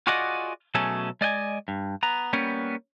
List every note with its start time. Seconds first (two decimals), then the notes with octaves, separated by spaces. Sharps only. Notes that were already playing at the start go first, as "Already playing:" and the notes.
0.07 F4 F#4 G#4 D5 D#5 F#5
0.75 B2 F#3 A3 C#4 G#4 A4
1.21 G#3 D5 D#5 G5 G#5
1.68 G2
2.03 B3 A#5
2.33 G3 A#3 B3 C#4